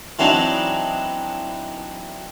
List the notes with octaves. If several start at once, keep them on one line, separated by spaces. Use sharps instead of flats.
E3 F#3 C4 D4 D#4